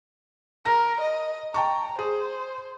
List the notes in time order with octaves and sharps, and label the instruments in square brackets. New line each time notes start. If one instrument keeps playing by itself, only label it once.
[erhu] A#4 [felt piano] A#6
[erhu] D#5
[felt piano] G5 A5 C#6 [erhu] A#5
[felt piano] G#4 [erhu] C5